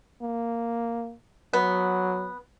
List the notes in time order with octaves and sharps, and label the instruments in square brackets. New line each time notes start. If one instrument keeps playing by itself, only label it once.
[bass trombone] A#3
[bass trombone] F#3 [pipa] B3